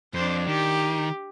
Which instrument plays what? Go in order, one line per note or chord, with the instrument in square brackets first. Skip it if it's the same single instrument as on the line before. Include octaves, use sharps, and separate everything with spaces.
[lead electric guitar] F2 [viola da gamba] D4 C5
[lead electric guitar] D#3 [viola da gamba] G4